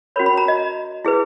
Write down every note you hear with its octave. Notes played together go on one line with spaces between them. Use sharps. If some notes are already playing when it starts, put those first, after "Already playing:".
C#4 F#4 A#4 C#5 B5
B5
A#5
D#5
E4 G#4 B4